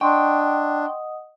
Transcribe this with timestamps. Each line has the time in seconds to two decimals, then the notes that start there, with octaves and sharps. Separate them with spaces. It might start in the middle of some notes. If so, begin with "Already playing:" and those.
0.01 D4 D#5 F#5 G5 C6 C#6 D#6